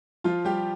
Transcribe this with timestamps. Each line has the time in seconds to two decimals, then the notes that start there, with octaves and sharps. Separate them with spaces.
0.24 F3 F4
0.45 G3 G4